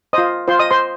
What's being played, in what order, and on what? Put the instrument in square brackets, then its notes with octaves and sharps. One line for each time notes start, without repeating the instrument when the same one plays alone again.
[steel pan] F4 C5 D#5 D#6
F4 C5 C6
D#5 D#6
C5 C6